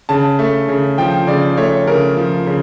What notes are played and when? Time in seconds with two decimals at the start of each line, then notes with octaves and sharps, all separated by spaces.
0.09 C#3 A5
0.39 A3
0.68 C#3
0.98 F3 G5
1.27 C#3 D5
1.57 A3 C#5
1.87 C#3 A#4
2.17 F3
2.47 C#3